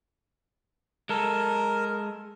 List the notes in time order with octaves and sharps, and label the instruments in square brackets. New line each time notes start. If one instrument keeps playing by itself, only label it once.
[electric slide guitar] G#3 A4 [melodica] A#4